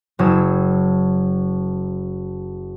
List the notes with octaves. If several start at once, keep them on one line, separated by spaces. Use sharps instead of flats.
F#1 F#3 D#6 E6 G#6